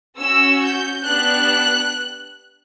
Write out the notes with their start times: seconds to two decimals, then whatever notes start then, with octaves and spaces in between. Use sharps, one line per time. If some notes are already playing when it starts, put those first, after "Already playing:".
0.17 C#4 F#4 E6
0.62 G6
1.06 B3 D4 G4 F#6